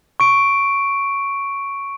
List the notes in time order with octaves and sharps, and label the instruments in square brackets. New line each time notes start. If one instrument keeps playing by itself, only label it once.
[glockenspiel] C#6 D7